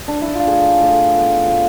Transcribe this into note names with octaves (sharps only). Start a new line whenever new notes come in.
D4
E4
F4
A2 G#4
A2
B3
F3